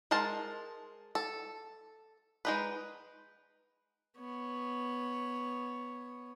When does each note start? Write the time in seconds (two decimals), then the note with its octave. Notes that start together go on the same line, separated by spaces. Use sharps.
0.11 G#3 A#4 C5 A5
1.15 A4
2.45 G#3 D#4 B4
4.18 B3 C#5